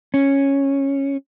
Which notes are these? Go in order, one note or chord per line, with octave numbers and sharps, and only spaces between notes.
C#4